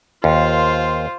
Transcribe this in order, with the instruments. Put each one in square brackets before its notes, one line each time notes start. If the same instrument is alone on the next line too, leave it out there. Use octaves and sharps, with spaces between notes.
[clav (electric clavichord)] D#2 [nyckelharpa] F4 C5